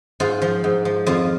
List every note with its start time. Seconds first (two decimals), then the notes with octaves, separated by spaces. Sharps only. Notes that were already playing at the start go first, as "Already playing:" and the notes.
0.20 G#2 F4
0.42 F3
0.64 G#2
0.85 F3
1.06 F2 F4